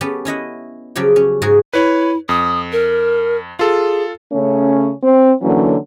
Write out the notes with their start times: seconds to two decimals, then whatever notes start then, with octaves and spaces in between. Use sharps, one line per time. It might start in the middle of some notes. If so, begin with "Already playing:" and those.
0.01 B3 C#4 G4 A4
0.25 C#4 E4 D#5 F#5
0.96 C#3 F3 F#3 G4 G5
1.16 C#4
1.42 G#2 G#3 F#4 G#4
1.73 E4 B4 C#5
2.29 F2 D#6
2.72 A#4
3.59 F4 G#4 A4
4.32 C#3 A3 C#4
5.02 C4
5.42 D3 E3 F#3 A#3 C#4